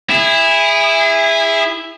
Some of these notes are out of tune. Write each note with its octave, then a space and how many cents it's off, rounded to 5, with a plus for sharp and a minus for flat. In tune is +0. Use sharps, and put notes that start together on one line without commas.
E4 +0 G#4 -30